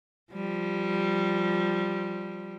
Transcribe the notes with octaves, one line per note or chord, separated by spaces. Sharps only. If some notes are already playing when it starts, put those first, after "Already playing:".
F3 G3